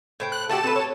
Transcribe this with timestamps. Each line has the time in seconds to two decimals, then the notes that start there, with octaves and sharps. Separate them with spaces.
0.20 A2 C5 G5
0.32 F#6
0.49 A3 F#4 G4 A4 A5 E7
0.63 C4 A#4 B4
0.76 C#5